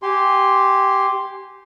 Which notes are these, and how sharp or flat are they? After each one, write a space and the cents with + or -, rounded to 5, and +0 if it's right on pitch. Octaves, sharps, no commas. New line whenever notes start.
G4 -10 G#5 -20 C6 +0